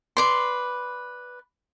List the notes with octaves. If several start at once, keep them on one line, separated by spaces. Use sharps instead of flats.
B4 D5 C6